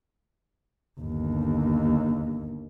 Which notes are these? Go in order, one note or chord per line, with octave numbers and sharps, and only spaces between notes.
G1 D#2